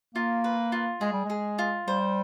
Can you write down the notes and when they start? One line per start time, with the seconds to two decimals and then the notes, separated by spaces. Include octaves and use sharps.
0.15 A#3 F4
0.44 B4
0.72 F4
1.01 G#3 G#4
1.13 G3
1.25 G#3 G#4
1.59 F4
1.87 G3 C5